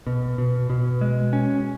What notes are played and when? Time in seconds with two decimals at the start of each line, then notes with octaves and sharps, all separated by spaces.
0.07 B2
0.38 B2
0.70 B2
1.01 G#3
1.33 C#4